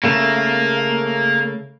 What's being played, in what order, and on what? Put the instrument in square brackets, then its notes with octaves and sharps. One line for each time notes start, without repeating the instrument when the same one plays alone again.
[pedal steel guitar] C#3 A3 [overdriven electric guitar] A#3